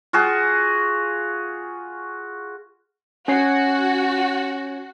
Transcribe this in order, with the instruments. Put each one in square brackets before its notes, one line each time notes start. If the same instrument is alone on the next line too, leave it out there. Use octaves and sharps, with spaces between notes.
[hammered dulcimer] F4 F#4 G#4
[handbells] C#4 C#5 C7 [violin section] F#4